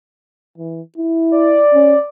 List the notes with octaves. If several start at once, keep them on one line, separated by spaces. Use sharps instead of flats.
E3
E4
D5
C#4